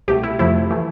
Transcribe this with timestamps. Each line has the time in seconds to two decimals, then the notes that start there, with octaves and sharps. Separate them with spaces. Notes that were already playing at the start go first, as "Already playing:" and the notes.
0.08 C2 B2 A3 G4
0.23 E4
0.39 F2 C3 F3 A3 E4
0.71 E3 A3